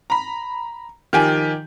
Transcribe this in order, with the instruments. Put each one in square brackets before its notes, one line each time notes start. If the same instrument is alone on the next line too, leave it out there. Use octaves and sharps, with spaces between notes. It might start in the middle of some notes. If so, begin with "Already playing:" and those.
[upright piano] A#5 B5
D#3 F3 G4 G#5